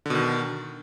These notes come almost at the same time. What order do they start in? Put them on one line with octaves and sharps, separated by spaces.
D3 B2 D#3